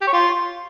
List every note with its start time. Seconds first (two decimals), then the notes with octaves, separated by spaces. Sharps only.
0.01 G4
0.07 C#5
0.13 F4